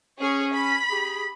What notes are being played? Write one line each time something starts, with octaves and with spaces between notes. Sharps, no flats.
C#4 G#4 C#5
B5
G4 G#4